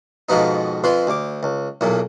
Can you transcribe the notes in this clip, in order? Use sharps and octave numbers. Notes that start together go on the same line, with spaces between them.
F2 G#2 B2 F3 B3 D#4
F2 F3 B4 C6
D2 D6
C#2
B1 E2 A#2